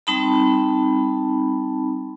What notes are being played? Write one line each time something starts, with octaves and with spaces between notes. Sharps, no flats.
G3 C4 D#4 A5 B5